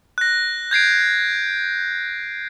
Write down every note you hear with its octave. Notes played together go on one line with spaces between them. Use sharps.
F#6 A#6
G6 G#6 C7 D7